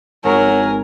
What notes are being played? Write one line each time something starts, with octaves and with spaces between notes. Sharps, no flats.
G#1 F#3 A#4 G#5